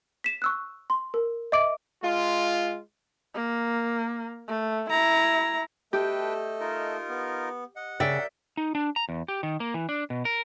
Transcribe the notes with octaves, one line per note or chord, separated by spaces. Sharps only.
B6 E7
C#6 E6 F#6
C6
A#4
D#5 E5 D6 D7
G#3 F4
A#3
A3
E4 A#5
A3 G4 A4 B4 D#5 G5
D#4 F4 A#4
B3
D#5 F#5
C#3 A#4 D5 E5 G5 G6
D#4
D4
A#5
E2
G4
D#3
A#3
E3
D4
B2
A#4